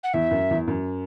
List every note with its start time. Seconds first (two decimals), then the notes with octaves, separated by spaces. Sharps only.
0.03 F#5
0.13 E2 E5
0.31 F#2
0.51 E2
0.68 F#2